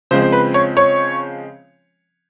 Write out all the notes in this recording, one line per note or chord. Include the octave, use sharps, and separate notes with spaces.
C#3 F3 G#3 C4 C5
C5
B4
C#5
C#5